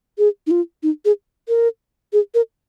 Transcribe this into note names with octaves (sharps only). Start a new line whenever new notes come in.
G#4
D#4
F4
D#4
G#4
A#4
G#4
A#4